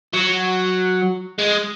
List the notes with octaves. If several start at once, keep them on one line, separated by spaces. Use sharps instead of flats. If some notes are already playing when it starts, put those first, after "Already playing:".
F#3
G#3